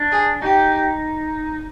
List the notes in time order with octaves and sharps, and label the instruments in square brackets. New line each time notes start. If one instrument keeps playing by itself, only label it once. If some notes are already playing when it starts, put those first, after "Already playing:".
Already playing: [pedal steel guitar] D4
[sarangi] G#4
[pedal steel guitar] D#4 [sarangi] G4